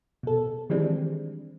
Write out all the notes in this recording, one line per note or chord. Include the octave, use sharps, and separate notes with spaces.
B2 A4
D#3 E3 G3 G#3 C4 D4